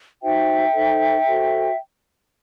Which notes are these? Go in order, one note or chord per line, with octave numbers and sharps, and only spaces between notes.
D#4 F#4 C5 E5 G5
D#4 A4 C5
F#4 A4 C5